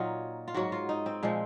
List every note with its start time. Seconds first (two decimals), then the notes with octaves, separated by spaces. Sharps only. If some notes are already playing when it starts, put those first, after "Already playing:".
Already playing: A#2 F#3 D#4 F4
0.48 F4
0.54 G#2 F#3 F#4
0.72 F4
0.89 D#4
1.06 C4
1.23 A#2 F3 G#3